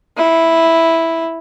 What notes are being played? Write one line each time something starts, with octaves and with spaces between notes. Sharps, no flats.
E4